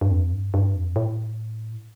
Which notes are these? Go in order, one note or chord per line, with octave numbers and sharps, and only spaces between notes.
G2
F2
G2
G2
F2
A2